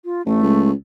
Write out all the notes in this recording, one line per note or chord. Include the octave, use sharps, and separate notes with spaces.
F4
A1 A3
C#2